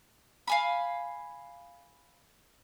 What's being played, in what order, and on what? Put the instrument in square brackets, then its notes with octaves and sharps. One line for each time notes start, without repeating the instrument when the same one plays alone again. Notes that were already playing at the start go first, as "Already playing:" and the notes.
[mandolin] F5 G#5 B5